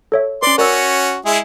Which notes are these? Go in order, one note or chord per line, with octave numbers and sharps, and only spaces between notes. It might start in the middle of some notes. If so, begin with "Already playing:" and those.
A4 C#5 E5
C#4 B4 D5 C6
C#4 F#4 A#4 D5 E6
G#3 E4 G#4